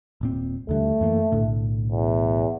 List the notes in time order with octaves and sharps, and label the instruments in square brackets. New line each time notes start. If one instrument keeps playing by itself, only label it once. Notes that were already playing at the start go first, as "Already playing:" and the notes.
[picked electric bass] D#1 A#2 C4
[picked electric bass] D#2 D3 G3 [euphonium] A3
[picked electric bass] F#2 E3 A#3
B1 A2 D3
[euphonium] E2